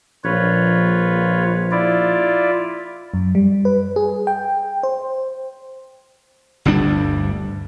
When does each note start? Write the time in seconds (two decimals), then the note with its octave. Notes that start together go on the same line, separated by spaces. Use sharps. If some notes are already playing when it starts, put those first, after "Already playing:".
0.24 A#1 F4 B4 C#5
1.71 E4 F4 D5
3.14 F#2
3.35 G3
3.65 B4
3.96 G#4
4.27 G5
4.83 C5
6.65 G1 D2 G3 D4